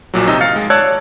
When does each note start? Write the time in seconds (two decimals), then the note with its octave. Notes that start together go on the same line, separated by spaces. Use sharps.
0.14 A#1 A#2 F#3
0.27 D#2 C3 D#4 D#5 E6
0.41 F5 A6 C#7
0.56 G#3
0.70 C#5 D5 A5 E6 F#6 G#6